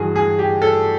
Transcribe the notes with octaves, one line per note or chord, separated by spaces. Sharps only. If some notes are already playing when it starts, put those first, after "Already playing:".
Already playing: G2 E3 F#4 G#4
G#4
G4
A4